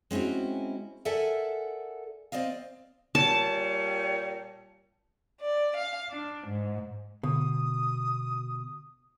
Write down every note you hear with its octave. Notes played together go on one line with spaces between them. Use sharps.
G#3 C4 C#4 E4 F#4
A4 A#4 D5 E5 F#5 G#5
C4 D5 D#5 F5
A#2 G3 C#5 A5
D5
F5
D4
G#2
B2 D3 D#6